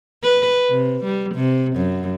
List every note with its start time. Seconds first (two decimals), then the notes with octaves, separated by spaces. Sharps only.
0.23 B4
0.70 C3
1.04 G3
1.35 C3
1.76 F#2